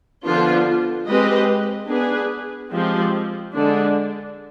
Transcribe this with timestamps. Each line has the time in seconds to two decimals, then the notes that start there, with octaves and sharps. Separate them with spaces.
0.24 D3 F3 B3 D4 F4
1.07 G#3 C4 G4 B4 D#5
1.88 B3 D4 G#4 B4
2.71 F3 G#3 C4 G4
3.53 D3 G#3 D4